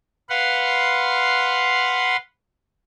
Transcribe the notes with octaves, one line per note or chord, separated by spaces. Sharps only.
B4 F5 F#5 C6